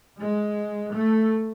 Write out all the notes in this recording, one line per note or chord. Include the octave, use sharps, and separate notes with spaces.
G#3
A3